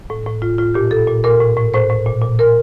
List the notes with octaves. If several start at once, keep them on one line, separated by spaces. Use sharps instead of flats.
A2
A2
A2 F4
A2 F4
A#2 G4
A#2 A4
A#2
A#2 A#4
A2
A2
A2 C5
A2
A#2
A#2
A#2 A#4